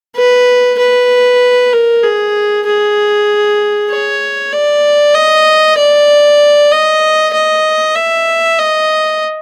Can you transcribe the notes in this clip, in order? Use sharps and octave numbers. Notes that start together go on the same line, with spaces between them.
B4
B4
A#4
G#4
G#4
C#5
D5
D#5
D5
D#5
D#5
E5
D#5